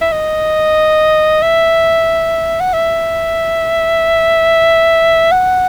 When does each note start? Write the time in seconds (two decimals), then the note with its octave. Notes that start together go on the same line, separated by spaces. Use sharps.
0.01 E5
0.12 D#5
1.42 E5
2.60 F#5
2.73 E5
5.32 F#5